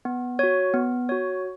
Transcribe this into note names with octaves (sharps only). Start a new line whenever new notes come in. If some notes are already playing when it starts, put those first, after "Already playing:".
B3
F#4 C#5
B3
F#4 C#5